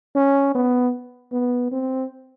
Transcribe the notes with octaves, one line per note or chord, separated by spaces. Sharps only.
C#4
B3
B3
C4